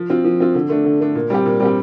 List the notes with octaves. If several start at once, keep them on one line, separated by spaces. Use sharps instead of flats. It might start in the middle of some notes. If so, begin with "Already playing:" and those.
Already playing: F3
C4 F4
F3
C4 F4
D3
A3 D4
D3
A3 D4
A#2
G3 C4 G4
A#2
G3 C4 G4